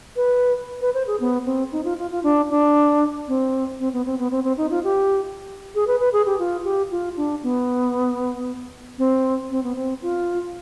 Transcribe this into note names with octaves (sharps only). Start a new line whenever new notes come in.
B4
B4
C5
G#4
B3
C4
D#4
F4
F4
F4
D4
D4
C4
C4
B3
C4
B3
C4
C4
D#4
F4
G4
G#4
B4
B4
G#4
G4
F4
G4
F4
D4
B3
C4
C4
B3
C4
F4